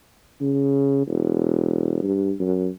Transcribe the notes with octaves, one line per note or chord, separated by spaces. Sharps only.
C#3
E1
G2
F#2